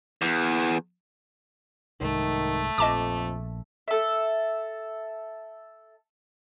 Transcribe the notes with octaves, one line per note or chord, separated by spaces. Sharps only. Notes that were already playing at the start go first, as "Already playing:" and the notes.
E2
C2 G#2 D#3 A3
A#1 F2 D#5 A5 D6
A4 E5